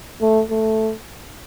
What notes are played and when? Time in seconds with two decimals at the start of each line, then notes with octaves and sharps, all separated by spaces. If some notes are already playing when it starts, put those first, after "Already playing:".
0.21 A3
0.50 A3